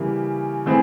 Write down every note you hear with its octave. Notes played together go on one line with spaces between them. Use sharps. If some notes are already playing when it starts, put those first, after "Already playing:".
Already playing: C#3 E3 G3 A#3
E3 A3 C4 E4 G#4